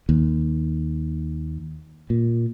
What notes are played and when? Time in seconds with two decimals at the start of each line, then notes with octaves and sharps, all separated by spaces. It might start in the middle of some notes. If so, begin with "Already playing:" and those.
0.09 D#2
2.10 A#2